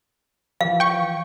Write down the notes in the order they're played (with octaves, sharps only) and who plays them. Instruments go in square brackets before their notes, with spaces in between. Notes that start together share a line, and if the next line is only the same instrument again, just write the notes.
[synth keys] E3 F3 [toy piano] F5
[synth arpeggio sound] G5 C#6